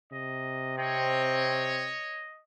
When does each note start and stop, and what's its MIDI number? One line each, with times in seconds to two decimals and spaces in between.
0.12 1.97 48
0.12 0.77 75
0.78 1.85 60
0.78 2.24 73
0.78 2.41 75